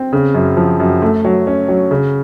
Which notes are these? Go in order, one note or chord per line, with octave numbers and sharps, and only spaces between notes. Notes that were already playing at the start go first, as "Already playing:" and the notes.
Already playing: C4
C#3
F#2
F3
F#2
A3
F#3
C#4
F#3
C#3